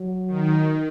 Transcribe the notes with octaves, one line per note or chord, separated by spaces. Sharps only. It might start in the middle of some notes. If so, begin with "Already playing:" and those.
Already playing: F#3
D#3